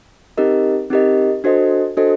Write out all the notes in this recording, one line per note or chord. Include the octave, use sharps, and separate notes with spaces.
C4 D#4 G4 A#4 D#5
C4 D#4 G4 A#4 D#5
D4 F#4 A4 C5 D#5
D4 F#4 A4 C5 D#5